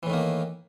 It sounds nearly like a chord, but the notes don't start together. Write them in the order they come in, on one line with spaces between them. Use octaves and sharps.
E3 A2 D#3 A#3